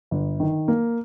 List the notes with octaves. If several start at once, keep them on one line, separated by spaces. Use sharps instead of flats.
G1
D#3
A#3